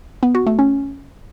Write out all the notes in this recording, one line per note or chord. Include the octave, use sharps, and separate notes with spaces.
B3
F#4
A3
C#4